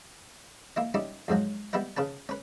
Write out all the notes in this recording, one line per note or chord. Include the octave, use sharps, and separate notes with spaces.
A#3 E4 D#5
G3 C#4 D#4 E4 G4
F2 G#2 F3 F#3
G3 B3 E4 B4 D#5
C#3 C#4 B4 A5
C#4 B4